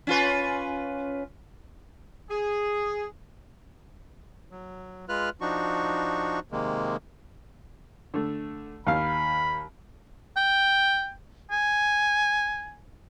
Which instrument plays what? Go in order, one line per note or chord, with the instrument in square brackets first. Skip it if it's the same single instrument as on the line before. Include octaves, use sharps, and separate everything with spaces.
[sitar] C#4 F4 B4
[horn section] G#4
[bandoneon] F#3
G#3 F4 B4 F6 F#6
F3 D4 D#4 F#4 C#6
C3 D#3 G#3 A#3
[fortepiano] D3 A3
[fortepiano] D#2 F5 [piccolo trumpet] B5
[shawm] G5
G#5